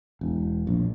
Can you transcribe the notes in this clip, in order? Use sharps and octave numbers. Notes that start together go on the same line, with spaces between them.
E1
A#1